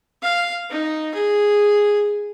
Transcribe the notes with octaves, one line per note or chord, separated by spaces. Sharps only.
F5
D#4
G#4